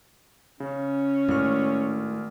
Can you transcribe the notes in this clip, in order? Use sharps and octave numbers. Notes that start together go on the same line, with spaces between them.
C#3 C#4
G#1 A2 F6